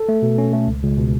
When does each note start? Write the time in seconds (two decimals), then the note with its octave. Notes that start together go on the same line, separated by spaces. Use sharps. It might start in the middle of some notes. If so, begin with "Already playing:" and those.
Already playing: A4
0.09 A3
0.22 B2
0.38 C#4
0.53 A3
0.67 C#2
0.82 C#2
0.97 B2